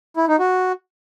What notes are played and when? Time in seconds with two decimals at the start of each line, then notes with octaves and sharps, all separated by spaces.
0.17 E4
0.28 D#4
0.39 F#4